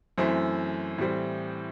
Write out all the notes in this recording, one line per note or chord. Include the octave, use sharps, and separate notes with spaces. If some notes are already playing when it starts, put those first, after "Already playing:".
F#2 E3 A3 C4 E4
A2 E3 G3 C4